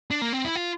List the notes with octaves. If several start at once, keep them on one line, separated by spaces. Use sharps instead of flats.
D4
A#3
C4
E4
F4